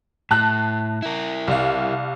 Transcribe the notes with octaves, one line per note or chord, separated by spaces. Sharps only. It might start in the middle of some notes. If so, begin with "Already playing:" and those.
A2 A5 F#6
E4 A#4
C2 F5